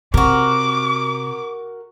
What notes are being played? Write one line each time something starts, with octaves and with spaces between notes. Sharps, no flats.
C3 F#4 A#4 D6